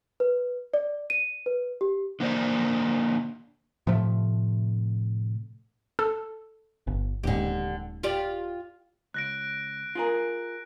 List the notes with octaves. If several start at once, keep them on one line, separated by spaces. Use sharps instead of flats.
B4
D5
D#7
B4
G4
D3 A#3 C5 D5
A2 C3 F3 A3
A4
G1
D#1 G#2 D3 G4
F4 G4 D5
C#2 F#6 A#6 D7
F4 G#4 A#4